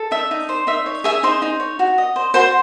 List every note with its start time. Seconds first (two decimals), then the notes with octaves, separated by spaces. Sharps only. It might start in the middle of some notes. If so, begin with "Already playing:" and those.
Already playing: A4
0.11 D#4 E5
0.31 D#4
0.49 C5
0.67 D#4 E5
0.86 C#5
1.04 G#4 E5
1.23 D#4 C5 C6
1.42 D#4
1.60 C#5
1.79 F#4
1.98 D#5
2.16 C5
2.34 F#4 C5 C6